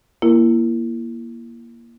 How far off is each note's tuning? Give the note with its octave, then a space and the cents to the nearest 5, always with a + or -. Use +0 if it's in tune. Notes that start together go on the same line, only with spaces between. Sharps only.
A#3 +15 E4 +30 A#4 +0